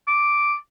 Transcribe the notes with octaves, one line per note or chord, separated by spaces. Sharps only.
D6